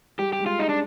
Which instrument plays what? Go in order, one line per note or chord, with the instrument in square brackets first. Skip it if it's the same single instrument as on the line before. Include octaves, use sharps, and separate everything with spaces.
[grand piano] G3 [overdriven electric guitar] G4
[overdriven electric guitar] G4
[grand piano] G#3
[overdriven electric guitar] F4
D#4
D4